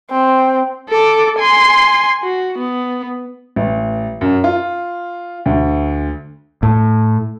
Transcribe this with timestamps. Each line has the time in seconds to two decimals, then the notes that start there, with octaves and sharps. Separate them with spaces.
0.11 C4
0.90 A4 D6
1.39 G#5 C6
2.23 F#4
2.58 B3
3.56 A1
4.21 F#2
4.44 F4
5.46 D2
6.63 A2